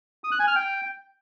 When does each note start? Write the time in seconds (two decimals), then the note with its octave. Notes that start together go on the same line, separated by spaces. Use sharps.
0.24 D#6
0.32 F#6
0.40 G#5
0.47 F6
0.55 G5